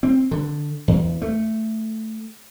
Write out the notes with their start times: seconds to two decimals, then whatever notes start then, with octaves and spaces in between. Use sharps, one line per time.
0.03 C4
0.31 D3
0.88 E2
1.22 A3